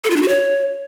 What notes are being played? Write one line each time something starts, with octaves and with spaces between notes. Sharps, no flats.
A4
F4
D4
F#4
C#5